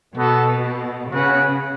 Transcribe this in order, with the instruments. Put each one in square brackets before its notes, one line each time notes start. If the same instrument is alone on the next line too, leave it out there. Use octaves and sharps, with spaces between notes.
[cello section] B2 [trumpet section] B3 F#4 A4
[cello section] C#3 [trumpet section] C#4 F#4 B4 F#5